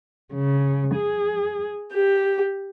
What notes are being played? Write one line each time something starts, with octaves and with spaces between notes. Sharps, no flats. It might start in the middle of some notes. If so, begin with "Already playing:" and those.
C#3
G#4
G4